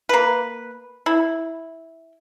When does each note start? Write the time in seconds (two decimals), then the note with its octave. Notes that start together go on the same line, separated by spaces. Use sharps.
0.09 A#3 B4
1.06 E4